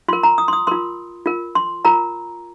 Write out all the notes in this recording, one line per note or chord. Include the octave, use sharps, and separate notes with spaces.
F4 A#4 C6
A#5
D#6
C6
D#6
F4 A#4 C6
F4 A#4
C6
F4 A#4 A#5